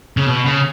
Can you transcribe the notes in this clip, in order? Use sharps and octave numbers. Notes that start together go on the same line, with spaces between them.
C#3
B2
C#3